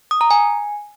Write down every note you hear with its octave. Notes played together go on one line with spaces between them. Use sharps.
D#6
A#5
G#5